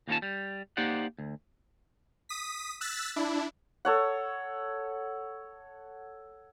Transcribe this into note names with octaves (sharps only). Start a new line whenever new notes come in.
D#2 E3 A#3 C#4 F4 A5
G3
A#3 D#4 G4 C5 D5 F#5
D2
D#6 B6
E6 F#6 A6 B6
D4 E4
A4 C#5 F#5